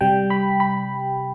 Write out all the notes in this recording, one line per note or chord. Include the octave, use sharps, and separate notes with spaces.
C3 G3 G5
B5
B5